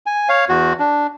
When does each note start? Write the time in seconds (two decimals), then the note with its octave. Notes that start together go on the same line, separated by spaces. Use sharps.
0.06 G#5
0.29 C#5 F5
0.49 E2 F#4
0.79 D4